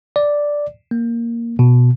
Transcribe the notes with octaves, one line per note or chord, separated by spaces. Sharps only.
D5
A#3
B2